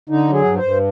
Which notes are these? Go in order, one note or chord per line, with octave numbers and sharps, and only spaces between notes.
D3 D#4
F#3
G#4
G2
C5
G2